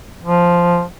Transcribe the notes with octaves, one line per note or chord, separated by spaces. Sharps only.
F3